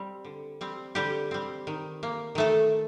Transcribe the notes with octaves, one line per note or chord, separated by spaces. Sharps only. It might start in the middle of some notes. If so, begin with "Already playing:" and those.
Already playing: G3 C4
D3
G3 C4
D3 G3 G4
G3 C4
D#3
A#3
D#3 A3 A4